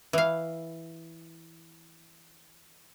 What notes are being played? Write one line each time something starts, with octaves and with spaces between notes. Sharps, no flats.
E3 F5